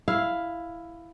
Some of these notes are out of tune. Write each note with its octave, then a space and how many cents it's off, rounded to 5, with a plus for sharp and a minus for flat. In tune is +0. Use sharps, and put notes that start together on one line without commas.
E4 +10 F5 +0